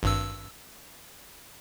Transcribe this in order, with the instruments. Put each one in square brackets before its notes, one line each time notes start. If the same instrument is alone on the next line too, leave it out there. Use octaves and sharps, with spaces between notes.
[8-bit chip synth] G#1 G2 E6